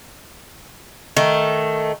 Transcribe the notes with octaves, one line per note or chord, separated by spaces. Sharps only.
D#3 A3